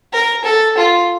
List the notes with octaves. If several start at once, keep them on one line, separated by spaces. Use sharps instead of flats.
A#4
A4
F4